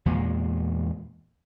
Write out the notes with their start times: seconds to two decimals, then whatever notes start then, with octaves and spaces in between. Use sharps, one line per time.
0.06 E2 A#2 G#3